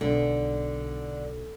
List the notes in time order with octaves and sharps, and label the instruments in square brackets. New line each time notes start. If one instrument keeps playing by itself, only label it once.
[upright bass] B1 [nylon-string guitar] D3